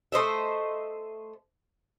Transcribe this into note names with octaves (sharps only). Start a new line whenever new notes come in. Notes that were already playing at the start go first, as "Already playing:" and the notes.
A3 C5 D#5 E5